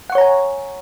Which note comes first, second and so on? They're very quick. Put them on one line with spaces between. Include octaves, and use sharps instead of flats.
F#5 C#6 C#5 A#5 G#5